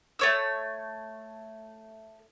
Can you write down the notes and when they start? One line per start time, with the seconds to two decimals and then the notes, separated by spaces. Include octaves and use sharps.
0.19 A3 C#5 E6